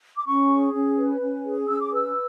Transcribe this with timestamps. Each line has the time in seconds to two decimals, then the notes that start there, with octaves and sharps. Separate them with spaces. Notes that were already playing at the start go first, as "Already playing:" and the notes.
0.17 D6
0.25 C#4 C#6
0.49 G#4
0.73 C#4
0.96 B4
1.21 C#4
1.44 G#4
1.68 C#4 E6
1.81 D6
1.92 B4 E6